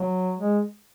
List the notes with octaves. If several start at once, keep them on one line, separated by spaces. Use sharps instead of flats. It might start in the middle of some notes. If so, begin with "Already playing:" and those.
Already playing: F#3
G#3